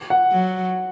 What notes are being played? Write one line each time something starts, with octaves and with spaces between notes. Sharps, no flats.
F#5
F#3